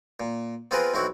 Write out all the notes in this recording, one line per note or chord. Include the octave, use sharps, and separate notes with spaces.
A#2
B3 C4 F4 G#4 A#4 B4
B1 C4 E4 F#4